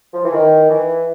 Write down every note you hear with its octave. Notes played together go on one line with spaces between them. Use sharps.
F3
E3
D#3
E3